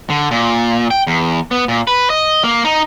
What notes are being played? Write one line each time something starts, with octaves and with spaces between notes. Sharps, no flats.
D3
A#2
G5
E2
B3
A#2
B4
D#5
A#3
D#4